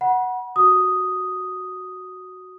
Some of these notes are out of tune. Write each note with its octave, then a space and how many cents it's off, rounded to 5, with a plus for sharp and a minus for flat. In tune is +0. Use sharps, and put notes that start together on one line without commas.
F#5 +0 B5 -40
F#4 +0 D#6 +0